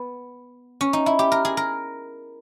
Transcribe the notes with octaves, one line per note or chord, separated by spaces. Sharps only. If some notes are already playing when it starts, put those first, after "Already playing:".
Already playing: B3
C#4
D#4
E4
G4
A#4
G#4
A#4